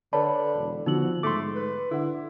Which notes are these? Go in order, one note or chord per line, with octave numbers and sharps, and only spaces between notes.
D3 B4 C#5 D5 A5 B5
E1
D3 F3 B3 D#4 F#4 E6 F#7
G#2 A3 C6 D6 A6
B4
D3 E4 A4 F#5